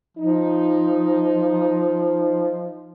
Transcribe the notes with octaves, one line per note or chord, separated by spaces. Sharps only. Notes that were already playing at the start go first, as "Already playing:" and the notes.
F3 D#4